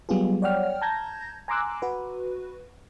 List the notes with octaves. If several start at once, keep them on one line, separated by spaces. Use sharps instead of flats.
F#3 G3 B3 F4 G4 G#4
C#5 D5 F#5 G5 F6
A5 A#5 G6 G#6 A#6
G#5 A#5 C6 D6 E6 F#6
F#4 B4